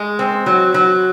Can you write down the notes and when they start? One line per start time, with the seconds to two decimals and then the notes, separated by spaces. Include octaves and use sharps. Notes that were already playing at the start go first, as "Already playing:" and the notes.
Already playing: G#3
0.19 C4
0.46 F#3
0.74 F#3